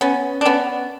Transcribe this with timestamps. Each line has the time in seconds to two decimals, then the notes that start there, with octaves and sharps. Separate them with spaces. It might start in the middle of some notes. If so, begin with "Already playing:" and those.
0.01 B3 C#4
0.41 D4
0.45 B3 C#4